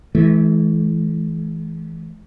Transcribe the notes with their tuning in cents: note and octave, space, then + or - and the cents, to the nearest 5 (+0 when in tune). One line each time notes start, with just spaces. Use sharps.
E3 -15 G#3 +45